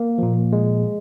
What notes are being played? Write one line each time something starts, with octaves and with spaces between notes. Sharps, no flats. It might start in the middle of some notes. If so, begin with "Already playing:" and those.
Already playing: A#3
A#2 F3
G#3